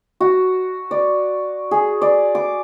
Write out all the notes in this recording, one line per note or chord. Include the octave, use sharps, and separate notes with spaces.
F#4
D5
G#4
D5
D6